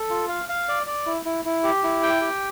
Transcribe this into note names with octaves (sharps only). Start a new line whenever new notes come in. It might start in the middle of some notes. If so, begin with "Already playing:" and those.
Already playing: A4
F4
F5
F5
D5
D5
E4
E4
E4
G4
E4
G5
G4